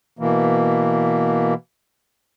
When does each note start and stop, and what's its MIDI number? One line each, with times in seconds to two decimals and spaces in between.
0.19 1.54 47
0.19 1.54 52
0.19 1.54 58